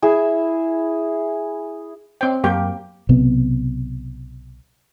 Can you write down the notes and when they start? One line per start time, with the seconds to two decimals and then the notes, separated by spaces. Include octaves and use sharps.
0.02 E4 G#4 E6
2.21 C4 C5 C#5 D#5 G5
2.44 F#2 F#3 A#3 G4 G5 D6
3.09 B1 C3 B3